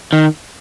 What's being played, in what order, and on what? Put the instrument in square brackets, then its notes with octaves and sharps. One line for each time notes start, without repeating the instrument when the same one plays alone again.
[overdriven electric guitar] D#3